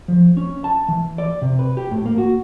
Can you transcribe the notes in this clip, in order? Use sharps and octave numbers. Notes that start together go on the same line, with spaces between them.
F3
C#4
A5
E3
D5
C3
B4
G4
A2
A#3
F#4